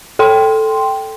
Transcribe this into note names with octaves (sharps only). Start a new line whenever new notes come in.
A4 G5 C6